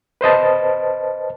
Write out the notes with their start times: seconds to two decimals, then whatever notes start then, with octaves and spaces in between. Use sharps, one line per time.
0.21 B4 C5 D#5 A5